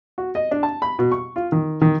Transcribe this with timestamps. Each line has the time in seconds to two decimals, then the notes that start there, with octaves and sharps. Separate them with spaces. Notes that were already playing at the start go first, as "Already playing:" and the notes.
0.18 F#4
0.35 D#5
0.51 D4
0.63 A5
0.82 B5
0.99 B2
1.12 C#6
1.36 F4
1.52 D#3
1.81 D#3